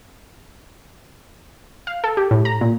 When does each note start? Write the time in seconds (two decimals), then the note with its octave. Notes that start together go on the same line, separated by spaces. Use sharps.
1.87 F5
2.04 A4
2.17 G4
2.31 A2
2.45 A#5
2.61 A#2